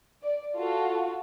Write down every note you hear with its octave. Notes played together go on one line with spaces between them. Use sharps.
D5
F4 F#4 A4